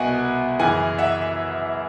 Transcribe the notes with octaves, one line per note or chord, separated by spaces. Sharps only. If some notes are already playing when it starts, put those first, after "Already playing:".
Already playing: C2 B2 F#5 G#5
F#2 C#3 E3 F#5 G#5
E5 F#5